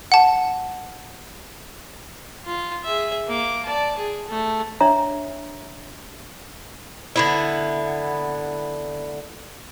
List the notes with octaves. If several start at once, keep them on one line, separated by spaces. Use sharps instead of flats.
F#5 A5
F4
G#4 E5
A#3 D6
D5 A5
G#4
A3
D4 C#5 E5 A#5
D3 B3 E4